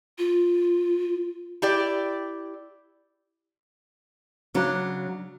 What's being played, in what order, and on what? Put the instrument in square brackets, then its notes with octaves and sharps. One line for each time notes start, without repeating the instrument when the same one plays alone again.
[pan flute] F4
[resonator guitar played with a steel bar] E4 G4 D5
[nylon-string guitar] C#3 F#3 D4